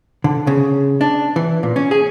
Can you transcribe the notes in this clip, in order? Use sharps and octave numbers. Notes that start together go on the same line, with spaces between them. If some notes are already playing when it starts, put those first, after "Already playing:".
D3
C#3
D4
E3
A#2
C#4
G#4